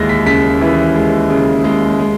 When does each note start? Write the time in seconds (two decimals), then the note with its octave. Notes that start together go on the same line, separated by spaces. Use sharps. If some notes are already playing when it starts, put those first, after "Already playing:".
Already playing: D#2 E3 G#3 A#6
0.09 B6
0.26 C#3 B6
0.61 E3
0.95 G#3
1.30 C#3
1.64 G#3
1.99 G#3